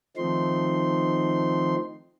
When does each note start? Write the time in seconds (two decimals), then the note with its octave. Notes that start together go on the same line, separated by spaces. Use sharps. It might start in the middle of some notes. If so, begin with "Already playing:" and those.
0.17 D#3 F3 A3 C4 D#4 C6